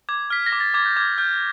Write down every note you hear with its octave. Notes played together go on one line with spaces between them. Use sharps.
D6 G#6
F6 B6
A#6
D6
A6
D6 G#6
G6
D6 G#6
F6 G6